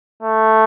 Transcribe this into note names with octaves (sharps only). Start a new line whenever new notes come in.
A3